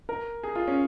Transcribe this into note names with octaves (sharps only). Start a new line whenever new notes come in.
A#4
G#4
F4
C#4